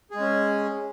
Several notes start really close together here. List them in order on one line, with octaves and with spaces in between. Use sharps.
G#4 G#3 C#4